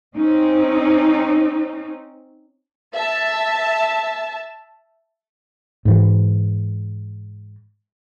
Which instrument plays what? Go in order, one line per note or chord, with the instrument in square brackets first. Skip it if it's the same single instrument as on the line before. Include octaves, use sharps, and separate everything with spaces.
[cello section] C4 C#4 D#4
[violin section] E5 A5
[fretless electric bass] G#2 E3